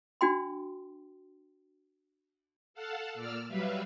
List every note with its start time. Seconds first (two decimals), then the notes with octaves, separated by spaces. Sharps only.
0.21 D4 F#4 G5 C6
2.74 A4 F5 F#5 A5
3.14 A#2 D5 E6 F6
3.48 F#3 G3 B4 E5 F5